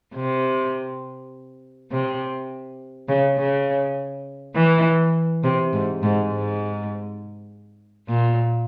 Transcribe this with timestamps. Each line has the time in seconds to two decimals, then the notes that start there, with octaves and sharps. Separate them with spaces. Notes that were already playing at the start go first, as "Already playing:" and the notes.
0.15 C3
1.91 C3
3.08 C#3
3.38 C#3
4.55 E3
5.44 C3
5.73 G#2
6.03 G#2
6.32 G#2
8.08 A#2